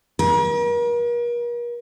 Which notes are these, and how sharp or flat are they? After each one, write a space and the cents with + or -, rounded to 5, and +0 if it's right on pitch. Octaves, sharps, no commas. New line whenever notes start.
A#4 +40